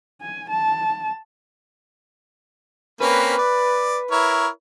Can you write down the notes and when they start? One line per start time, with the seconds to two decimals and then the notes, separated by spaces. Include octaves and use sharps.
0.21 G#5
0.50 A5
3.01 A#3 C4 C#4 B4
3.38 D5
4.11 E4 A#4 C#5